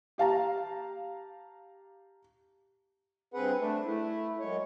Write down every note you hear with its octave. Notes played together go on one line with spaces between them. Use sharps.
G4 F5 A5 A#5
G2 C4 G#4 B4 F#5
A3 D4
A3 E4
F#2 G#3 C#5